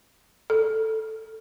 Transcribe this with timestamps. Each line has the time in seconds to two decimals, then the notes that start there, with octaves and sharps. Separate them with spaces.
0.50 A4